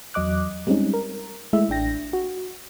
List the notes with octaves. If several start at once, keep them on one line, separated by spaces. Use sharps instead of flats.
E2 F#3 D#5 D6 F#6
G3 G#3 C4 C#4 D#4
A#4
G#3 A3 E4 E5
A1 D4 G5 A#6
F#4